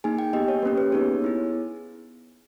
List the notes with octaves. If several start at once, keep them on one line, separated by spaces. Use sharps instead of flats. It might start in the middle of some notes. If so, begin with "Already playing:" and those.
A#3 D#4 G#4 G#5
G5
B3 G4 D#5
C#5
A#3 C#4 G4 B4
B4
B3 D#4 G#4 C#5
B3 E4 G#4